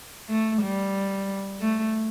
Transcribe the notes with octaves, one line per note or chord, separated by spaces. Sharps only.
A3
G3
A3